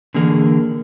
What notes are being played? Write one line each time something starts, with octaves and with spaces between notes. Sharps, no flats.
D3 E3 A#3 G#4 A#4